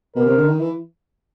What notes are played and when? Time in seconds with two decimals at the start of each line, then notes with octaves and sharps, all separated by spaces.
0.15 B2 A#4
0.26 C3
0.37 D3
0.48 D#3
0.59 E3